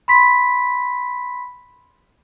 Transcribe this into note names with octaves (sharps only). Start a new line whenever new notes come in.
B5 C6 B6